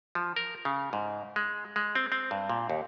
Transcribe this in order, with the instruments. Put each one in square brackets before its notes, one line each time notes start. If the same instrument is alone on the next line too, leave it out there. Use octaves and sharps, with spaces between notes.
[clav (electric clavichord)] F3
A#4
C#3
G#2
G#3
G#3
C4
C4
G2
A#2
D#2